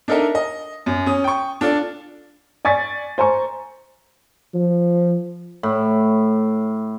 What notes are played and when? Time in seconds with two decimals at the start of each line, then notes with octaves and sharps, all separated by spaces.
0.08 D4 D#4 A4 A#4 D#5 E5
0.35 D#5
0.86 F#2
1.06 C#4 D#6
1.24 G5 C#6
1.61 D4 F4 A4 D5
2.65 D5 G#5 C#6 A6 B6
3.18 C5 G#5 A#5 C#6
4.54 F3
5.63 A2